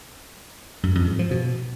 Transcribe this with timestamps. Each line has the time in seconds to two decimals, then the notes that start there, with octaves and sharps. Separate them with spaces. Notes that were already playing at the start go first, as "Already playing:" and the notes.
0.83 F#2
0.95 F2
1.07 G#2
1.19 F3
1.31 B2